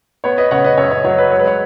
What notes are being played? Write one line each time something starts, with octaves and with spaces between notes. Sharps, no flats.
B3 C#5
B4 D#5
C#3 C#5 F#5
B4 D#5
F#2 C#5
C#5
F#3 C#5
B4
G#3 C#5
B4
C#5